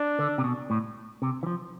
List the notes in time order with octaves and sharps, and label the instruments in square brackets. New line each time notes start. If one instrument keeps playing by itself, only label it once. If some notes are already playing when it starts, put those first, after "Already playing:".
Already playing: [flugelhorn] D4
[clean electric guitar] D3
C3
B2
A2
C3
E3
F3